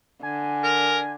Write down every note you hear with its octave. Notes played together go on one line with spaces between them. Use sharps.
D3 G#5
A#4